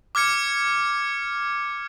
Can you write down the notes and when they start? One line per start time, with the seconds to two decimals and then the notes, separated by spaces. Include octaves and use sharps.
0.15 D6 F6 G#6 C#7